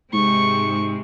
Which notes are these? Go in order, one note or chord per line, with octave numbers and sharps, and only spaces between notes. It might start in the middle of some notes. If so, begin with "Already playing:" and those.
G#2 C3 G#3 C#6